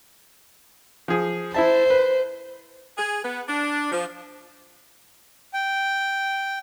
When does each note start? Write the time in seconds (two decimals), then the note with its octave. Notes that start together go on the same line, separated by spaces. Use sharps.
1.08 F3 G#4
1.54 E4 C5 E5 A5
1.90 B4
2.97 G#4
3.23 B3
3.47 D4
3.91 F3
5.54 G5